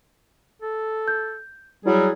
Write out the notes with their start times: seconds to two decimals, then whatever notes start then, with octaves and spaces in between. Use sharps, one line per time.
0.62 A4
1.08 G6
1.86 F#3 G3 E4 F#4 G#4